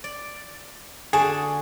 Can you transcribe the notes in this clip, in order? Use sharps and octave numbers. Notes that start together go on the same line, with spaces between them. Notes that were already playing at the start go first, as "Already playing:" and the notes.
D5
D3 F#4 G#4 A5